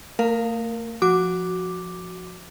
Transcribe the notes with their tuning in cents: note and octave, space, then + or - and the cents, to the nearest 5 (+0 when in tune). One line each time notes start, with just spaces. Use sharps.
A3 +45 A#4 +0 F5 +0
F3 +0 F#4 +0 D6 +0